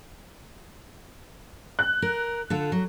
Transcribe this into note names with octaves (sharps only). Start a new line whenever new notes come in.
F#6
A#4
D3 F4 A4
F#3